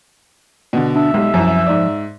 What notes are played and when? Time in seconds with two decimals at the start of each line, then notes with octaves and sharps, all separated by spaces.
0.73 B2 D3
0.96 D4 E5
1.14 B1 G3 G#3
1.34 C2 F#2 F3
1.66 G#2 D5